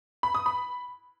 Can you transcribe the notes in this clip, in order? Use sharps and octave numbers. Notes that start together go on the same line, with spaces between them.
B5
D#6
B5